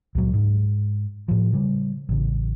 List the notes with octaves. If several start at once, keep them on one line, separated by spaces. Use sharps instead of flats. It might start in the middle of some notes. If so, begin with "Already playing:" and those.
C#2 A#2 F#3
G#2
A2 F3
C#3 G3
A1 C#3